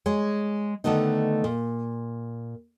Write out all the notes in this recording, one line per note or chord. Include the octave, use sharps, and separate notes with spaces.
G#3 G#4 C#5
D3 D#3 A3 B3 D#4
A#2